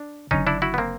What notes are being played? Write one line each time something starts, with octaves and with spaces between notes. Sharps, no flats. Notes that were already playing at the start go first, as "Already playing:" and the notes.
Already playing: D4
F#1 F#2 D3 C#4 D#4
D4 E4
E4 F#4
B3
A#3 C4